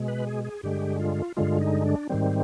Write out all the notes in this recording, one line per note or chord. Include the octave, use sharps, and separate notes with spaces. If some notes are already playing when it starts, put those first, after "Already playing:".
Already playing: B2 G#3
B4
G#4
G#4
G2 D3 G#3 G4
F4
G2 D3 G#3 F4
D#4
D4
G#2 D#3 G3 C4